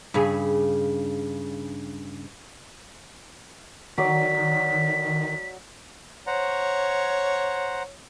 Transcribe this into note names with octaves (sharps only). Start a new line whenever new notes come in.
G2 C#3 G#4
D#3 F#3 D5 D6 B6
C5 C#5 F#5 A#5